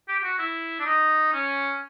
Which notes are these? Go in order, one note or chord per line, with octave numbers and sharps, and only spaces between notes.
G4
G4
F#4
E4
D4
D#4
C#4